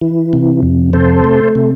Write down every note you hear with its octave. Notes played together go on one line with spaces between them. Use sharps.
E3
C3
F2
C3 A4 C5
A3
C3